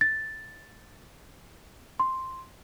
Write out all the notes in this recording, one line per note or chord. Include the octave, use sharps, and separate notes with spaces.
A6
C6